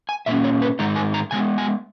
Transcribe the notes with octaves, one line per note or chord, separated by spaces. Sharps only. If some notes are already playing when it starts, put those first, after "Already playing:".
G#5
A#2 A#3 C#4 E5
C#5
B4
G#2 D#3 G#3 D#4 A#5
G#5
A#5
C#3 G#3 B3 G#5
G#5